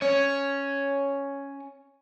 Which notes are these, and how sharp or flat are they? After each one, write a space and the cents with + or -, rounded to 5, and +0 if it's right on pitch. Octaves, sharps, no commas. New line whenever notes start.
C#4 +0 C#5 +5